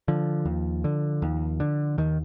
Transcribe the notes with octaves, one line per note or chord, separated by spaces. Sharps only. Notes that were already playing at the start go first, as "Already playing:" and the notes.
D3 F3
D#2
D3
D#2
D3
D#2 D#3